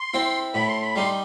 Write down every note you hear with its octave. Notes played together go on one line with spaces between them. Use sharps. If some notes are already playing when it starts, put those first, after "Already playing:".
Already playing: C6
C4 E4
A2 B5
C6
B5
G3 D#4 C6